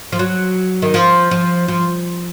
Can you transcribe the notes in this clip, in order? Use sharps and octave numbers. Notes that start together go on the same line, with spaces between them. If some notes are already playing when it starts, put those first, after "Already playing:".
F3
F#3
D#3
F3
F3
F3